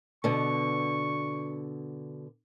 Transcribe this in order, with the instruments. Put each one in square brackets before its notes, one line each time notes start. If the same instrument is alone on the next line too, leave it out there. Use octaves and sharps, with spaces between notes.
[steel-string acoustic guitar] B2 D3 [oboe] C#6